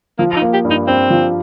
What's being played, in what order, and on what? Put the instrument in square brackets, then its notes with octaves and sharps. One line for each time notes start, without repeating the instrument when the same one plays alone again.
[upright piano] F3 [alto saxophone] A#3
[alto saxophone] F4
D#4
[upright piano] A#3
[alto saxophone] G4
[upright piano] G2
[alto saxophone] D#4
[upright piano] G2 [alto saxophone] C4
[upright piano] F3